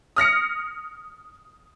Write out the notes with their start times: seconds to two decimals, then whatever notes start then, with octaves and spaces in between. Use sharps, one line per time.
0.16 D#6 F6 A#6 C#7